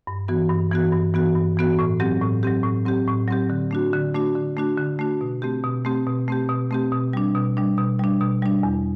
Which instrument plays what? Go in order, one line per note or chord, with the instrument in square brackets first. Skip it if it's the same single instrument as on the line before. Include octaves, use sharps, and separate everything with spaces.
[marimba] G2
E3 B3 F#4
G2
E3 B3 F#4
G2
E3 B3 F#4
G2
E3 B3 F#4
A2
F#3 C4 G4
A2
F#3 C4 G4
A2
F#3 C4 G4
A2
F#3 C4 G4
D3
A3 D4 F#4
D3
A3 D4 F#4
D3
A3 D4 F#4
D3
A3 D4 F#4
B2
A3 C4 G4
B2
A3 C4 G4
B2
A3 C4 G4
B2
A3 C4 G4
B2
G3 D4
B2
G3 D4
B2
G3 D4
B2
G3 D4
E2